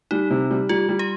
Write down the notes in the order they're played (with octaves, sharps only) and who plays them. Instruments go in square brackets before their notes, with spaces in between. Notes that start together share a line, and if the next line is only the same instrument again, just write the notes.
[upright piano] G3 [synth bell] D#4
[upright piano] C3
G3
[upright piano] G3 [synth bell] F4
[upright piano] G3
[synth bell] G4